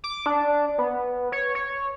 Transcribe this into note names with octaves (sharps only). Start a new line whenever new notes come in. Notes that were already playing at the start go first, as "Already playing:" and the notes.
D6
D4
B3
C#5
C#5